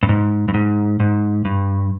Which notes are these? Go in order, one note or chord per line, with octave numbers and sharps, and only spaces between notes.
G2
G#2
G2
G#2
G#2
G2